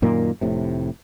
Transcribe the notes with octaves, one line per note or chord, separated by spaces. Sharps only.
F#2 A#2 D#3 A#3
F1 A2 C3